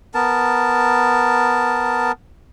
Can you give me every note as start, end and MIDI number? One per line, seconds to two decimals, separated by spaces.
0.14 2.12 59
0.14 2.12 70
0.14 2.12 81